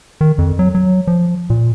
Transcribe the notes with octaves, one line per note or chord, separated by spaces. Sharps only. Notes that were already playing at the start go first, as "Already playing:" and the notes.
D#3
F2
F#3
F#3
F3
A#2